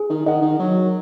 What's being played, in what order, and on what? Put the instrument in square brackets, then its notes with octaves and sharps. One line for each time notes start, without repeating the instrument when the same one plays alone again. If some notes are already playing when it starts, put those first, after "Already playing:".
Already playing: [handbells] G#4
[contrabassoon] D#3
[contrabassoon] D#3 [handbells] D#5 F#5
[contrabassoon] D#3
[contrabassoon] F#3 [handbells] F#4